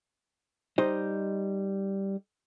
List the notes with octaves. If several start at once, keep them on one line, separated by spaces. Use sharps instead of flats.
G3 D#4 C5 D#5